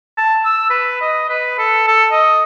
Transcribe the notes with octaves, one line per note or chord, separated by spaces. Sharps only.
A5
E6
B4
D#5
B4
A4
A4
D#5